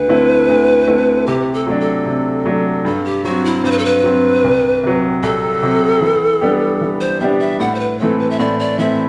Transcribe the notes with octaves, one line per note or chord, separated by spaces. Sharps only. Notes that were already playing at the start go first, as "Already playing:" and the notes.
Already playing: D2 B4
D3 A3 C4 E4
D2
D3 A3 C4 E4
C3 G4
A4
F#3 A3 D4
A4
C3
F#3 A3 D4
G2 A4
G4
F#3 C4 F#4
E4
G2 C5
B4
A4
B4
F#3 C4
C2
C3 F#3
C2 A4
C3 F#3
E3
G3 B3 D4 G4
E3
C5
G3 B3 D4 G4 E5
E5
A2 F#5
C5
B4
E3 A3 C4 A4
B4
E5
A2 D5
D5
E3 A3 C4 E5